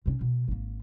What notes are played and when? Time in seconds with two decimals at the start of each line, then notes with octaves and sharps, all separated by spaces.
0.06 C3 C#4
0.21 B2
0.48 G#1 A#3